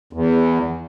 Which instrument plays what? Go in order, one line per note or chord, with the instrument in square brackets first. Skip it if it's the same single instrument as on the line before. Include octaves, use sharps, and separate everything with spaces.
[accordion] E2